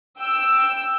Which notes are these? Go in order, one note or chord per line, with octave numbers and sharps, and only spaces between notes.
G5 E6